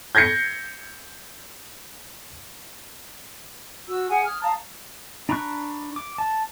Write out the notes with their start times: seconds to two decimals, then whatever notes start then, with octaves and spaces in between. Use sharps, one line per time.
0.15 G6 G#6 A#6 C7 C#7
3.87 F#4 E6
4.09 G#4 F#5 G#5
4.25 D#6 F6 G#6
4.42 F5 A5 A#5 D#6
5.29 D4 A#5 B5 C#6 F#6
5.96 D6
6.18 A5